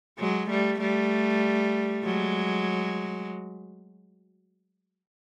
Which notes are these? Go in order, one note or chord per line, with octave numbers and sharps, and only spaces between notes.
F#3 G#3
G3 A3
G3 A3
F#3 G#3